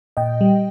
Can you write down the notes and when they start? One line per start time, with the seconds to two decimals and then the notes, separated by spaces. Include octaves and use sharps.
0.17 A#2 D#5 G5
0.41 G3